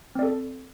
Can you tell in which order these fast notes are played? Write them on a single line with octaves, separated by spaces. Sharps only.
C4 D5 A4